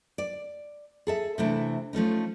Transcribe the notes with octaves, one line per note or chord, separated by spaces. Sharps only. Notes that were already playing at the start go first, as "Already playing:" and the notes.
D5
G#4 A4 E5
C3 E3 A3 D4 E4
F3 A3 C#4 D#4